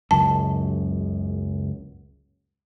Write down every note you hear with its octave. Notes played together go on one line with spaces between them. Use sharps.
F#1 C#2 F#2 A5